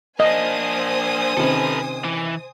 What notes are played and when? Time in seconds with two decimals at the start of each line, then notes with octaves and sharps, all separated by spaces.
0.20 A#3 D4 C5 D#5 G#5 D#6
1.37 C3 D#3 C#4 A4 B4
2.04 E3